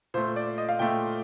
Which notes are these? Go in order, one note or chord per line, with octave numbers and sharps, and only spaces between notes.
A#2 A3 C5
D5
D#5
F5
A#2 A3 G5